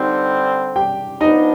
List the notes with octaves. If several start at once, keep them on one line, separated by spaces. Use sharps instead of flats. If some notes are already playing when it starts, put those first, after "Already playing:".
Already playing: D3 G3 C4 D#4
G4 G5
F3 B3 D4 D#4 D#5